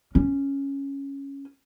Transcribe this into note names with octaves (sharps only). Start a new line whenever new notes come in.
C#4